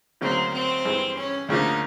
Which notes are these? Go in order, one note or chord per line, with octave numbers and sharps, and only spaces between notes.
D2 C#3 F#3 A#3 C4 D#4
C4
G2 E3 G#3
C#4
D2 C#3 F3 A#3 D4 D#4